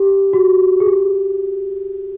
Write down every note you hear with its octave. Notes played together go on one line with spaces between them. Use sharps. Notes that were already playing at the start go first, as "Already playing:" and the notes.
Already playing: G4
F#4
G#4
G4